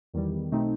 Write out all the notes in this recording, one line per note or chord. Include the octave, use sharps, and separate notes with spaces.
E2 D#3 G3
B1 B2 A3 C4 D#4